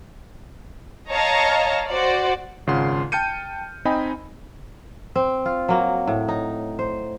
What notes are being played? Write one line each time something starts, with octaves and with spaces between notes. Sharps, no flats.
C#5 D#5 F5 A5 A#5
F#4 C5 D5
G#1 C#3 F4 F#5 C6
G5 A5 F6 G6 C#7 D#7
C4 D#4 D#5 G5 G#5 B5
C4
F4
F#3 A#3
A2
D#4
C5